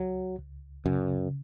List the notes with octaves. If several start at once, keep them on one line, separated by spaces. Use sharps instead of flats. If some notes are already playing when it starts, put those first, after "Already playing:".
Already playing: C#2 F#3
C#2
F#2 C#3